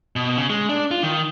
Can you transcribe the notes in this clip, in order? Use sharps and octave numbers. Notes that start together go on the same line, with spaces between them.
B2
C#3
G#3
D4
F4
D#3